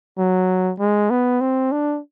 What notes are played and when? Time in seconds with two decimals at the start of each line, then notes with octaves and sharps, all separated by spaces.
0.18 F#3
0.79 G#3
1.10 B3
1.41 C4
1.72 D4